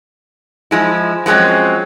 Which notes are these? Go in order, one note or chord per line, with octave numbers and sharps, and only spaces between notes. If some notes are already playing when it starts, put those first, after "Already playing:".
F3 G#3 E4
F3 F#3 G#3 C4 C#4